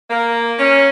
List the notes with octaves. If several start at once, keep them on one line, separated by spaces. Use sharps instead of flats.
A#3
C#4